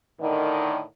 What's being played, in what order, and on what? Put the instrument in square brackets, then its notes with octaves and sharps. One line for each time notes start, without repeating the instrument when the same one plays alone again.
[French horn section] A2 D3 D#3